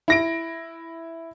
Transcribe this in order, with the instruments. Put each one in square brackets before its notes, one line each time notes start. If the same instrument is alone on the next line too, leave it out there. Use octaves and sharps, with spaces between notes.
[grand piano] E4 A#6 D7